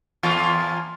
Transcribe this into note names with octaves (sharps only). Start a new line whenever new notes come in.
E2 A#2 F4